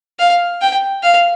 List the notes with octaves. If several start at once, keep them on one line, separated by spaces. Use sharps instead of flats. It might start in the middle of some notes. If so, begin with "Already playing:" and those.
F5
G5
F5